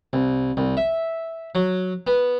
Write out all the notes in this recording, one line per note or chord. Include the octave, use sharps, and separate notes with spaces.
C2
C2
E5
F#3
B3